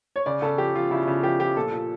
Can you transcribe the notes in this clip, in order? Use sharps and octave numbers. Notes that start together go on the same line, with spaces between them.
C#5
C#3 D5
C#3 A4
F3 G4
F3 F4
C#3 E4
C#3 F4
F3 G4
F3 G4
A#2 A4
A#2